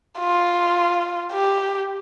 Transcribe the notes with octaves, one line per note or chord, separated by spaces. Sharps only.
F4
G4